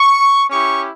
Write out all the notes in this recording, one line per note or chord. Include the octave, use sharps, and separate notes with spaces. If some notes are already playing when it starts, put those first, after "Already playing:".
Already playing: C#6
C#4 E4 G4 C#6